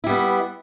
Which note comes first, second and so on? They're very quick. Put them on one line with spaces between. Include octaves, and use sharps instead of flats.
E4 G3 B3